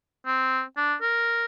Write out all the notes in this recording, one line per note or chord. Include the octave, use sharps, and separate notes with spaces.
C4
D4
A#4